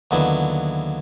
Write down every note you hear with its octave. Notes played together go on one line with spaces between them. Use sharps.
D#2 D3 F#3 B3 E4